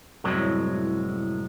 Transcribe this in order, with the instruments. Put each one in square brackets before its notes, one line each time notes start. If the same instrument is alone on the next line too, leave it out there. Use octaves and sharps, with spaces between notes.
[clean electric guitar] C2 F#2 A2 F#3 G#3